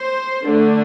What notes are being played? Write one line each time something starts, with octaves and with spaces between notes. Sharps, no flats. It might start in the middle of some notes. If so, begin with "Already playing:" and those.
Already playing: C5
D3 A3 D4